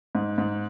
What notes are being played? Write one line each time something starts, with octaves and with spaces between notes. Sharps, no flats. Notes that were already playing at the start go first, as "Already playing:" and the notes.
G#2
G#2